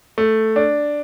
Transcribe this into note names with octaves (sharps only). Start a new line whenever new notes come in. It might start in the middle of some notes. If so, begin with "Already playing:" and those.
A3
D4